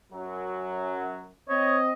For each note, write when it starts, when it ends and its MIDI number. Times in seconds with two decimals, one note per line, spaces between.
0.12 1.31 42
0.12 1.31 54
1.49 1.93 60
1.49 1.78 73
1.49 1.93 75